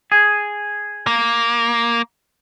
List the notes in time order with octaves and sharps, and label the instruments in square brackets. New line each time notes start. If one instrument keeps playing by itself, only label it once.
[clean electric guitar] G#4
[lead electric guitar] A#3